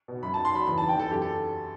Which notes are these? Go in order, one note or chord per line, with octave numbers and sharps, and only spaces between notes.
B2
F#2 B5
A5
D#4
C6
F#3 B5
E2 B5
A5
E2
G5
E2 A4
F#2 G4
A4